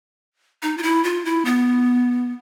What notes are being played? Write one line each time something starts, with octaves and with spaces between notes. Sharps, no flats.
D#4
F4
E4
F4
E4
B3